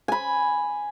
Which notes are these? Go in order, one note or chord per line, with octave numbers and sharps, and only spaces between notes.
G#5 B5